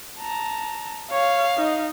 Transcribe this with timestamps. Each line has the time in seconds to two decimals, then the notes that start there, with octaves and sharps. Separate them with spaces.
0.19 A5 A#5
1.11 C#5 F5
1.57 D#4 D#5